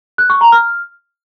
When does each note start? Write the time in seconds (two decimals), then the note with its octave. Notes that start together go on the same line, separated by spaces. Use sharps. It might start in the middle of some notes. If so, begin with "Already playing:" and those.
0.18 F#6
0.30 C#6
0.41 A#5
0.52 F6